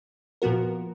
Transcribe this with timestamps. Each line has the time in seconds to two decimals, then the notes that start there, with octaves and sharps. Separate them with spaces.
0.42 A#2 F3 B3 F#4 A#4